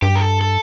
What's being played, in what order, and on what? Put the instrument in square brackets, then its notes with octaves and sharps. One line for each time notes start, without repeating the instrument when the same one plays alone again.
[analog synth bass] G2 [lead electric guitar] G4
[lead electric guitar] A#4
A4
A4